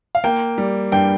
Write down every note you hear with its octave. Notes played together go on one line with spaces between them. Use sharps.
F5
A#3 G5
G3
G2 G5